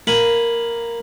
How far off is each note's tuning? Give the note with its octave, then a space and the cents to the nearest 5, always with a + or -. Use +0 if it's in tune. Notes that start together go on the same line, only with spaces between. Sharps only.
A#3 +0 G#5 +0 B5 +0